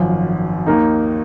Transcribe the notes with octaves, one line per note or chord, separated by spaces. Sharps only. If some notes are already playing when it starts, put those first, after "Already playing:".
Already playing: G#1 F#2 F3
D#2 D#3 A#3 D#4